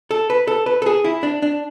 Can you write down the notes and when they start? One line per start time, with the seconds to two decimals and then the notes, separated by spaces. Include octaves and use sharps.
0.11 A4
0.30 B4
0.47 A4
0.66 B4
0.82 A4
0.86 G#4
1.04 E4
1.23 D4
1.42 D4